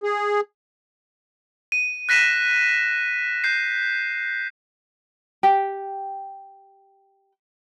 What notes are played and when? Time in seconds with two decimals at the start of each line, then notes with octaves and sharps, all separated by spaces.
0.04 G#4
1.72 D#7
2.09 F#6 A#6 B6 D#7 E7
3.44 G6 C7
5.43 G4 G5